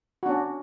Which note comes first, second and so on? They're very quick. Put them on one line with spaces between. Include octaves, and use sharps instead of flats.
F#4 D4 C#4